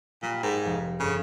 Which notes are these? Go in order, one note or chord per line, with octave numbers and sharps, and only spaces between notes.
A#2 G3 B5
G#2 A#4
F1 F5
G1 C#3